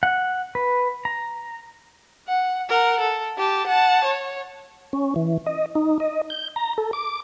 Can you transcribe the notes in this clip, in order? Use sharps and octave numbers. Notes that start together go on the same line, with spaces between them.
F#5
B4
A#5
F#5
A#4 F#5
A4
G4 A5
F#5 A5
C#5
C#4
E3
D#5
D#4
D#5
G6
A#5
A4
D6